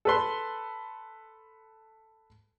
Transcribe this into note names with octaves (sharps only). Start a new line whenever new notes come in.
A4 B4 C6